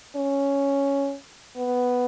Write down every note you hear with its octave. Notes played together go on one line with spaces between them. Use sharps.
C#4
B3